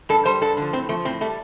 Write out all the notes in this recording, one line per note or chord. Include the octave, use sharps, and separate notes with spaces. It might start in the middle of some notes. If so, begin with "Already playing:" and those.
G2 A4
G3 C5
G2 A4
D3 F3
A2 C4
F3 A3
A2 C4
G3 A3